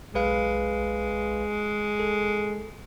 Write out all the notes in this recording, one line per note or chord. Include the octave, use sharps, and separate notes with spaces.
B1 G#3 B4 F5
A4